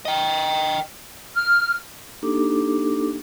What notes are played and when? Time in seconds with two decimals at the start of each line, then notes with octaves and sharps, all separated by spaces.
0.05 D#5 G5
1.34 F6
2.23 A#3 D4 D#4 G4 A4 D6